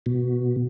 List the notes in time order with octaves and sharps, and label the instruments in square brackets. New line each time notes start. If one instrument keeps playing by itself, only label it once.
[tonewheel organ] B2